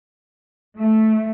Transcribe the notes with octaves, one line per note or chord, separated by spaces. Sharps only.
A3